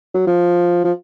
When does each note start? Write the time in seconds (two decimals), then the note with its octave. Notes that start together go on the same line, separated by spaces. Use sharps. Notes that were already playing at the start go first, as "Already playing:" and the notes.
0.14 F#3
0.27 F3
0.84 F3